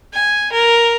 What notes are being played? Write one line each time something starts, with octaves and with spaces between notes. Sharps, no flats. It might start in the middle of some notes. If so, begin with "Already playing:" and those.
G#5
A#4